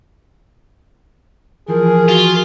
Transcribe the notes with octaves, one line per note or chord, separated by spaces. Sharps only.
E3 F3 G#4 A#4
F4 F#4